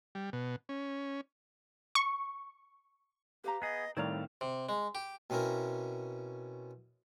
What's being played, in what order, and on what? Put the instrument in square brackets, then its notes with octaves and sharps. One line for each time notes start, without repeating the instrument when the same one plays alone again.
[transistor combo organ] G3
B2
C#4
[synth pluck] C#6
[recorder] G4 [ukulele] B4 F5 A#5
[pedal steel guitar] B3 G#4 [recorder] D#5
[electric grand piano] A2 D#3 [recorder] G3 [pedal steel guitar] C4 F5 [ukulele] C#5 D5 A#5
[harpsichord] C3
G#3
G4
B2 C4 C#4 E4 A#4